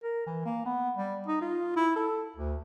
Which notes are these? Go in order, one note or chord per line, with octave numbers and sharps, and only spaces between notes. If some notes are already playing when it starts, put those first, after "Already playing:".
A#4
E3
A#3
B3
G3
D#4
F4
E4
A4
D2